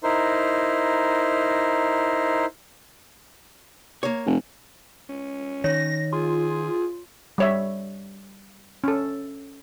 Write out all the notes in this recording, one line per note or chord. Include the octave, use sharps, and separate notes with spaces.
D#4 E4 A#4 C5
A#3 C#5
F1
C#4
D#3 C#5 A#6
F4 G#4
G3 C#5 E5
C#4 A4